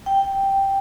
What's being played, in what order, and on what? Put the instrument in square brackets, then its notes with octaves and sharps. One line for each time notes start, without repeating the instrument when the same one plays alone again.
[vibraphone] G5